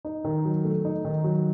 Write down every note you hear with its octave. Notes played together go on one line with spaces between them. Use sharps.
D#4
D#3
F#3
A3
D#4
D#3
F#3